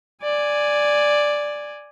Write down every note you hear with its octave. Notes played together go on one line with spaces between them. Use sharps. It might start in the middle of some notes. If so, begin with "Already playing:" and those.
D5 G#5